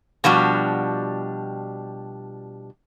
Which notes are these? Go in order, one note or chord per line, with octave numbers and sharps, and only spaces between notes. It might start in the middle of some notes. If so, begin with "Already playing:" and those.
B2 F3 G3 D4 F#4 G4